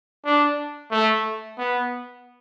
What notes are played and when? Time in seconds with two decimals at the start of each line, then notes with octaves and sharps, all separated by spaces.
0.25 D4
0.91 A3
1.58 B3